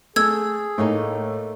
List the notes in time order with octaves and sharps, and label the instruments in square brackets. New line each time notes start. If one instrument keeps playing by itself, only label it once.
[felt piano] A3 [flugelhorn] G#4 [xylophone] E6 G#6
[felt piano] A2 [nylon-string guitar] A3 A#3 D#4